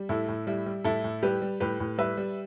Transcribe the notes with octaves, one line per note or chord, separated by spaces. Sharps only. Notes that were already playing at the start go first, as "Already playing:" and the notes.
Already playing: G3
A2 E4 A4
A2
G3 E4
G3
A2 E4 A4
A2
G3 G4 B4
G3
A2 G4 B4
A2
G3 B4 E5
G3